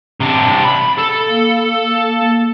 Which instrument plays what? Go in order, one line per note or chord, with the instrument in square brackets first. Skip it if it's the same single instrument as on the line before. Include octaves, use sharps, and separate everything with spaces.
[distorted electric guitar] C3 D4
B5
A4
[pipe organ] A#3